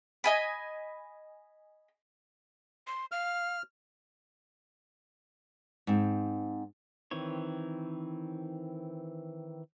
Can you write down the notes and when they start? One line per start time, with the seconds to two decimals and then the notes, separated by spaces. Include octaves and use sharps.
0.24 D#5 G#5 B5
2.87 C6
3.12 F5 F6
5.87 G#2 C4
7.11 D#3 E3 C4 C#5